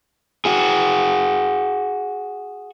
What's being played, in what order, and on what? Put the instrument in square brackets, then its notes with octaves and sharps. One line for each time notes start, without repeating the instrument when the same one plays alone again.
[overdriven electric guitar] F#4 G#4